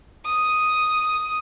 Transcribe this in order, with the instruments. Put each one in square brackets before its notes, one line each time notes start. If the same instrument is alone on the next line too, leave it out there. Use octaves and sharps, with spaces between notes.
[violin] D#6